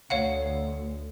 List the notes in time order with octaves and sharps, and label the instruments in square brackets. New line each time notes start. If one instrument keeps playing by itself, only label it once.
[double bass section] D2 [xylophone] C#5 F5 F#5